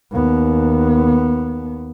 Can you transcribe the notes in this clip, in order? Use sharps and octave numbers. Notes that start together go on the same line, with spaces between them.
D#2 B3